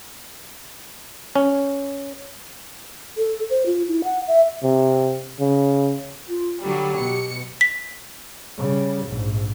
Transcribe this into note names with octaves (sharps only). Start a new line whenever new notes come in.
C#4
A4
C5
F4
E4
F#5
E5
C3
C#3
F4
D3 F#3 G3 G4
B2 C#7
B6
C#3 G3
A#1 G#2